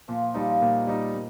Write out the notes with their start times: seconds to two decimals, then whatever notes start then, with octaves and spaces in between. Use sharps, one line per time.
0.08 A#2 F3
0.22 F3
0.34 F3 G3 D#4
0.48 F3
0.61 A#2 D#3
0.87 G3 D#4
1.15 A#2